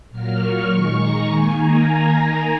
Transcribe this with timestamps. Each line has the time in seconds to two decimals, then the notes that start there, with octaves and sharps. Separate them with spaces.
0.11 A#2 F#3 A#3 F6
0.40 C#6
0.70 D#3 G#3
0.98 A#5
1.27 D#3 A#3 G#5
1.56 A#5